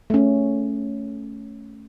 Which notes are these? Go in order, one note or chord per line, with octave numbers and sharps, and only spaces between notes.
A3 C#4